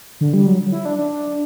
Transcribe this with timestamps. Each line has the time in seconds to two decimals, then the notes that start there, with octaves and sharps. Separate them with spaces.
0.21 D3
0.33 G3
0.46 F#3
0.72 E4
0.85 D4
0.99 D4